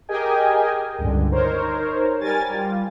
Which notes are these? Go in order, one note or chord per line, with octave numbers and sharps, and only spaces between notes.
G4 G#4 A#4 D#5 G5 G#5
C#2 G2 D3
D#4 A#4 C5 C#5
G3 A#4 G#5 A6
G3 F4